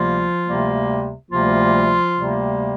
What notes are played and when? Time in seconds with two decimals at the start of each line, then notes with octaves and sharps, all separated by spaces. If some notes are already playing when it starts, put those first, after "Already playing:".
Already playing: D2 C3 F3 G3 A#3 F4
0.46 D2 C3 G3 A#3
1.31 D2 C3 F3 G3 A#3 F4
2.15 D2 C3 G3 A#3